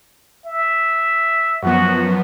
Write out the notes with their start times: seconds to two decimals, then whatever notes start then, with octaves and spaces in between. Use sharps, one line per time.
0.46 E5
1.63 F#2 F3 B3 F#4